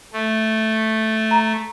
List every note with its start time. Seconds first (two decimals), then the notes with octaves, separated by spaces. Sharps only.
0.13 A3
1.31 A#5